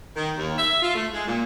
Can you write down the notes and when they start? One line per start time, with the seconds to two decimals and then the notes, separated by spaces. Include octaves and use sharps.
0.16 D#3
0.36 D#2
0.58 E5
0.82 F4
0.95 A3
1.13 G#3
1.27 A#2